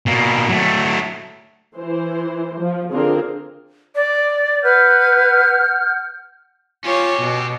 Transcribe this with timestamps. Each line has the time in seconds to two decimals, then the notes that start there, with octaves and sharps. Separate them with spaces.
0.06 B2 A#3
0.49 F#3 A3
1.76 E3 C5
2.60 F3
2.92 D3 C4 D4 F4 G#4 A#4
3.95 D5
4.63 B4 F#5 F6 G6
6.84 C#4 F4 G4 C#5
7.20 B2